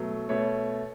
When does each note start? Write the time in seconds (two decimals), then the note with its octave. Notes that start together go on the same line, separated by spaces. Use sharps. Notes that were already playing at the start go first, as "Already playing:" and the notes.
Already playing: B2 F#3 A3
0.29 B2 A3 C#5